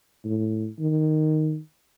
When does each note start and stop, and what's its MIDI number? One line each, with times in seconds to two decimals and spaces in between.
0.25 0.67 45
0.79 1.58 51